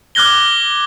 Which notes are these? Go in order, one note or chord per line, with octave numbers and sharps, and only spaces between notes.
D6 F6 F#6 G#6 A#6 G7